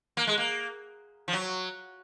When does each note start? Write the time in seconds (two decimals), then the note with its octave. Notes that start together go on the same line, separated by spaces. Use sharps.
0.17 A#3
0.27 G#3
0.38 A#3
1.28 F3
1.33 F#3